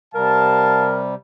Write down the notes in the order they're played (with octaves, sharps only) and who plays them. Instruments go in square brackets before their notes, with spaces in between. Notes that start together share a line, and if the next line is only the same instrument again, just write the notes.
[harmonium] C3 G3 [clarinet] A#4 [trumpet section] F5 A5